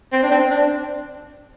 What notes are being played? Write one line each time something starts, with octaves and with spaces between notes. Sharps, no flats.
C4
D4
C4
D4